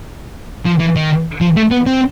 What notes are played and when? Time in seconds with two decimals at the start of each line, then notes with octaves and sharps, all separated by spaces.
0.66 F3
0.80 E3
0.96 D#3
1.41 F3
1.56 A3
1.71 B3
1.86 C4